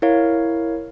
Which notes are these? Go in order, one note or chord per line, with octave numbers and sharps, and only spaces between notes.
E4 A#4 C#5 F5